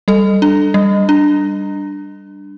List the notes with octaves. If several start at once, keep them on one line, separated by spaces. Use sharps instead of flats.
G3 A4
D4
G3
D4